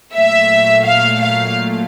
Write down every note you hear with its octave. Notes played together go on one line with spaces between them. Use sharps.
A#2 F#3 A3 E5
F5
F5